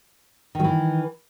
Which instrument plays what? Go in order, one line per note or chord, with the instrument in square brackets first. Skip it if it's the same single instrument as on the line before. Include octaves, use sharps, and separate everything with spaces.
[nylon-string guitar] D#3
F#3
E3